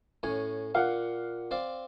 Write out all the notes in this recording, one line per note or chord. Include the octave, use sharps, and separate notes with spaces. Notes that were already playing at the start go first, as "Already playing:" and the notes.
A2 C#4 G#5
A#2 F5 F#5
C4 D5 F5